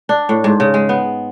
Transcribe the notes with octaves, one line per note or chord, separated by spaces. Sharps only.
D4
A2
G#2
C#3
G#3
B3